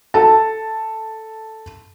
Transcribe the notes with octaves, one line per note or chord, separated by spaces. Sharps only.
A4 A5